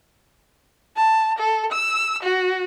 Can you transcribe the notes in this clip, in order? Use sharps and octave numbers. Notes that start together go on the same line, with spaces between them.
A5
A4
E6
F#4